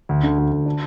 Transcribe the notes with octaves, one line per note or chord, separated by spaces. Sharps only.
D2
D3
D2
D2
D4